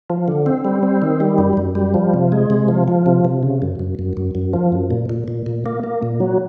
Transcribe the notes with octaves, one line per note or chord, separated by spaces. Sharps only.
F3
D3
C4
G3
C4
D#3
G3
F#2
F#2
G3
F3
C3
G#3
C3
F3
F3
C3
C3
C#3
F#2
F#2
F#2
F#2
F#2
F3
F#2
A#2
A#2
A#2
A#2
A#3
A#3
A#2
F#3